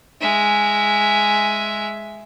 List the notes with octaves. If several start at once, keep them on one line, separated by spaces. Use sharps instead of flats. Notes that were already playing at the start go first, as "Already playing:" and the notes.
G#3 E5